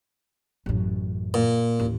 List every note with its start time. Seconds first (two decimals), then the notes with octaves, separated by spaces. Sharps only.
0.66 A1 F#2
1.34 A#2
1.79 A1 D#2